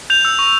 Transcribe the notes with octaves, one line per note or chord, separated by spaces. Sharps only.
G6 F7
E6
C#6